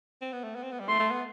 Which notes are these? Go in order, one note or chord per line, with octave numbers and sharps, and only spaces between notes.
C4
B3
A3
B3
C4
B3
G3
A3 C6
A3
B3